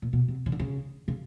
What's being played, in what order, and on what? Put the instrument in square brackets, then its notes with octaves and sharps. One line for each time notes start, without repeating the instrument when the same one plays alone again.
[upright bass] A#2
B2
C3
C#3
D3
C#3
C#3